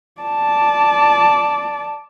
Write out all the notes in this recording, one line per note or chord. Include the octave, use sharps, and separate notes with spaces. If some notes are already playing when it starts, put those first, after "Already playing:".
D5 A5